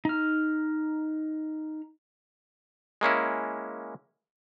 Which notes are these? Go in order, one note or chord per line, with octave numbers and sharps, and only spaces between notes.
D#4 F6
G#3 A#3 C#4 E4